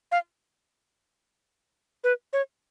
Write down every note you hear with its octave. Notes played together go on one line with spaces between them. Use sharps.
F5
B4
C#5